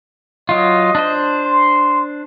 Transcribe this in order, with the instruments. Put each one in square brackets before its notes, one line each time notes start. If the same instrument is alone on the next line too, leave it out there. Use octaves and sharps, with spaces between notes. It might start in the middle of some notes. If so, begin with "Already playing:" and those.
[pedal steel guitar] F#3 F4 [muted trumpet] D#5
[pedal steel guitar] D4 C5
[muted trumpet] C6